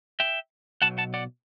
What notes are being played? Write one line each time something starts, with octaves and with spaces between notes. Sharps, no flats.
E5 G5
B1 B2 F#3 F#5 A5
F#5 A5
D5 F#5